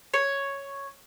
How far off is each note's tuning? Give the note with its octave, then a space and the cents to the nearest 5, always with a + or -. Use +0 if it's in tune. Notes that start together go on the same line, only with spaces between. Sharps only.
C#5 +0